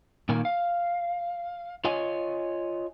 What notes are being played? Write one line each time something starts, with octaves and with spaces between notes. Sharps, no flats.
A#2 D#3 A#3 G#5
F5
F4 C#5 D#5 G#5